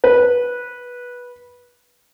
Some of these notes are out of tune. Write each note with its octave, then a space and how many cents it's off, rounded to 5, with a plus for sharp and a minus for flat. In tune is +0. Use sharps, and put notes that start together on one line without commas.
B4 -15